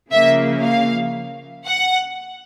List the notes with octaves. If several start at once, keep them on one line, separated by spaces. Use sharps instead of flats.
C#3 F3 A#3 E5
F5
F#5